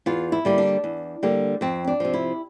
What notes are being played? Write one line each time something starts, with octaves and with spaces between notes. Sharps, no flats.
E2 F4
E4
D3 G3 A#3
D4
E2
D3 G3 A#3
F2 C4
D4
C3 F3
E4